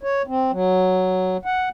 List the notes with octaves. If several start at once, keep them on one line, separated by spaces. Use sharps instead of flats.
C#5
C4
F#3
F#5